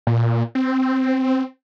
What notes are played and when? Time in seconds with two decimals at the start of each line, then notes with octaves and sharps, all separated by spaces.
0.07 A#2
0.55 C4